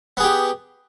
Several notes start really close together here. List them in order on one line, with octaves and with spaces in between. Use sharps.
B3 G#4 G4